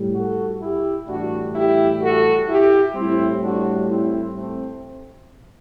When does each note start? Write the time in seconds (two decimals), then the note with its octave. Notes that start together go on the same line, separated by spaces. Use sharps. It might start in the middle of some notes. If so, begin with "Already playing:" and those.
Already playing: A2 G3
0.15 F#4 A4
0.61 E4 G4
1.08 A2 E3 G3 D4 F#4
1.55 E4 G4
2.02 F#4 A4
2.48 E4 G4
2.95 A2 G3 C4 E4
3.42 D4 F#4
3.88 C4 E4
4.35 A3 C4